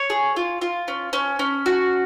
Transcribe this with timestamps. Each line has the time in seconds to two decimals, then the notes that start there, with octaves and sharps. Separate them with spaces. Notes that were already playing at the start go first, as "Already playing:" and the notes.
Already playing: C#5
0.10 G#4
0.36 F4
0.62 F4
0.88 C#4
1.13 C#4
1.39 C#4
1.66 F#4